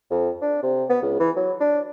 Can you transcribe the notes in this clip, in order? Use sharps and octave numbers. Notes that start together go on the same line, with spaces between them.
F2
D4
C3
B3
C#2
E3
F#3
D4